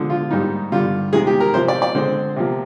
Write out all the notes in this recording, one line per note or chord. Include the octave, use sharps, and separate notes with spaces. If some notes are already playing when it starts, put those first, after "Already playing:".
Already playing: D3 F3 G#3
F4
G#2 G3 A#3 D#4
G2 D3 G3 F4
C3 D#3 G#3 G#4
G4
A#4
C3 F3 C4 C5
D5
D5
D3 G#3 C4 C5
C3 F3 A#3